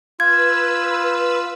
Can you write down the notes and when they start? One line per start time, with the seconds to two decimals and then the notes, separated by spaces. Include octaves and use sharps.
0.20 F4 B4 E6 G#6